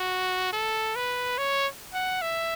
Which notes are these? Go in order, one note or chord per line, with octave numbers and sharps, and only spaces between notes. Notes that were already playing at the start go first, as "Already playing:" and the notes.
Already playing: F#4
A4
B4
C#5
F#5
E5